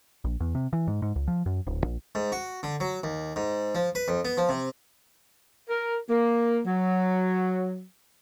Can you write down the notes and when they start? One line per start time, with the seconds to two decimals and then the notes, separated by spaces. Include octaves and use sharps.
0.24 A#1
0.40 E2
0.55 C3
0.73 E3
0.88 G#2
1.02 G#2
1.16 C#2
1.28 F3
1.46 F#2
1.67 D1
1.84 A#1
2.15 G#2
2.32 F#4
2.63 D3
2.80 F#3
3.03 D#2
3.36 G#2
3.75 F3
3.95 B4
4.08 F2
4.25 B3
4.37 F3
4.49 C3
5.69 A#4
6.09 A#3
6.66 F#3